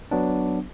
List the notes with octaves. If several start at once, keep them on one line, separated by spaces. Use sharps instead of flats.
F#3 B3 D4